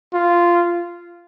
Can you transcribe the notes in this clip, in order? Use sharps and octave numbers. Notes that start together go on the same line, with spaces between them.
F4